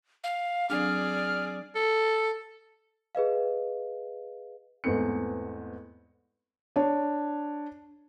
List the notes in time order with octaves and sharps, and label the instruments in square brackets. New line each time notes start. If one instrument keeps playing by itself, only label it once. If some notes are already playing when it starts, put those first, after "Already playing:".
[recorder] F5
[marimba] F#3 C4 D4 [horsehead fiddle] G#4 D5 [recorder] F6
[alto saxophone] A4
[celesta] G#4 B4 D#5 F5
[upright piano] E2 G#2 A3 B3 C4 C#7
[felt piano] D4 C#5